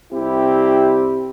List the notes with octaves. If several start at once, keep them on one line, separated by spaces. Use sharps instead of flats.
C2 C4 E4 G4